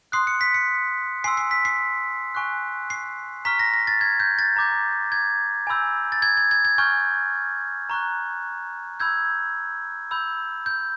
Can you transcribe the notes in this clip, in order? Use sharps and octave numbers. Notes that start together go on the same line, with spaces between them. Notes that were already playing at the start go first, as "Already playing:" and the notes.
C6 D#6 F#6 C7
C#7
B6
C#7
G#5 C6 E6 C7
C7
B6
C7
G#5 C#6 F#6
C7
A#5 C#6 F6 B6
A#6
A#6
A6
G#6
G6
A6
A#5 D6 G6
G#6
G#5 B5 E6 G6
A6
G#6
G#6
G#6
G#6
G#5 C#6 F6 G6
A#5 C#6 F#6
B5 E6 G6 G#6
B5 E6 G6
G6